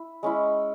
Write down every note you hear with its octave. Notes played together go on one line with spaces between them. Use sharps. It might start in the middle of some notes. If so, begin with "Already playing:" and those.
Already playing: E4
G#3 C#4 E4